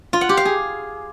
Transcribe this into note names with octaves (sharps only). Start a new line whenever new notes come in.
F4
F#5
G4
F5
G#4